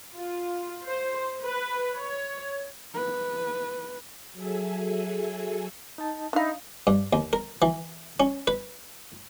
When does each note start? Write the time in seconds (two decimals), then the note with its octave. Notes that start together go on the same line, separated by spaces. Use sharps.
0.15 F4
0.85 C5
1.43 B4
1.95 C#5
2.95 B4
4.33 F#3 G#4 A4 E5 G#5
5.98 D#4 D#5 A5
6.33 D4 D#4 E5 F5 B5
6.87 G2
7.13 D#2
7.33 A#4
7.62 E3
8.20 C#4
8.47 B4